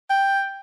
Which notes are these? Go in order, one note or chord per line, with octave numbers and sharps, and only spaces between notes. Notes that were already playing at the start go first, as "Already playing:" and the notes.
G5